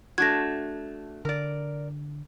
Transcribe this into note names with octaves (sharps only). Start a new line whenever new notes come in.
A3 D4 F#4 G#6 A#6
D3 A#4 D5